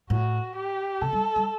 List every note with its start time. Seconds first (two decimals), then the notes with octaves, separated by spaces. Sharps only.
0.10 A2 F#4
0.55 G4
1.01 C3 A4
1.13 G3
1.36 G3